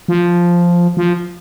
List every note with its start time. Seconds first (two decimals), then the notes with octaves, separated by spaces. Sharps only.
0.08 F3
0.97 F3